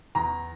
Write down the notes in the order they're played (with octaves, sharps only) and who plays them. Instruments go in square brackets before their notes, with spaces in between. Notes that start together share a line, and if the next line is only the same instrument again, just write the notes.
[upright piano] E2 A#5